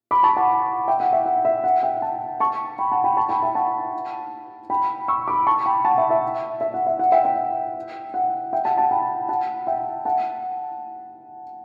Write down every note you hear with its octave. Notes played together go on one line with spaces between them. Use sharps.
B5 D6
A5 C#6
F#5 A5
E5 G5
F#5
E5
F#5
E5
F#5
E5 G5
F#5 A5
A5 C#6
G5 B5
F#5 A5
G5 B5
A5 C#6
G5 B5
E5 G5
F#5 A5
G5 B5
C#6 E6
B5 D6
A5 C#6
G5 B5
F#5 A5
E5 G5
E5
E5
F#5
E5
F#5
E5 G5
E5 G5
F#5
E5 G5
F#5 A5
F#5 A5
G5 B5
F#5 A5
E5 G5
F#5 A5